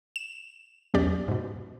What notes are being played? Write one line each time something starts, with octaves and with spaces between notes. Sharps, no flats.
E7
B1 E2 C#4 G4 D5
G#2 B2